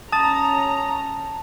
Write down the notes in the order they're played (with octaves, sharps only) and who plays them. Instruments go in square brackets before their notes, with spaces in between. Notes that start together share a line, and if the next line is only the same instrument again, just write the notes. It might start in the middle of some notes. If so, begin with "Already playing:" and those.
[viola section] C#4 A#5 [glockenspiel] A5 [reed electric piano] D#6 A6